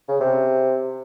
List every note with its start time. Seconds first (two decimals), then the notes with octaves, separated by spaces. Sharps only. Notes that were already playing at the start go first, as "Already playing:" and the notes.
0.08 C#3
0.20 C3